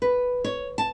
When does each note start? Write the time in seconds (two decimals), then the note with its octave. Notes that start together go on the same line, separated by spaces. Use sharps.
0.02 B4
0.44 C#5
0.78 A5